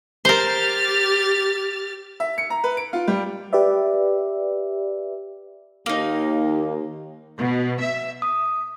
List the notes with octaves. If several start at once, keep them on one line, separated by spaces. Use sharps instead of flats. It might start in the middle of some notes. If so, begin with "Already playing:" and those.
G4 A#4 C5 F6 A6
E5
C#7
A#5
B4
D7
F4
G3
G4 B4 D5 E5
D#2 A#3 D#4
B2
E5
D#6